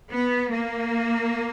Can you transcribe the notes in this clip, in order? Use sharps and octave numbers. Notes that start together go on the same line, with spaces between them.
B3
A#3